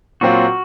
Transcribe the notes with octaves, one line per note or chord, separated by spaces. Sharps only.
A#2 F#3 C4 F4 F#4